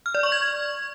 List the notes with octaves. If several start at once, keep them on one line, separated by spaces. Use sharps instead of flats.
F6
D5
C#6
G#6